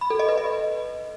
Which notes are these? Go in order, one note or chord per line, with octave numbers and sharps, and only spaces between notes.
B5
A4
D#5
B4
D#5